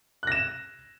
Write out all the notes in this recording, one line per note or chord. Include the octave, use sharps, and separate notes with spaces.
F#6 A#6 E7